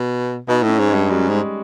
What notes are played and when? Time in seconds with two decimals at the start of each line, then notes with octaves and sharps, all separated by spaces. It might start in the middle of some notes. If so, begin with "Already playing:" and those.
Already playing: B2
0.48 B2 D#4
0.63 A2
0.68 C#4
0.79 G#2
0.89 G#3
0.94 G2
1.10 F#2 G3
1.29 G#2 G#3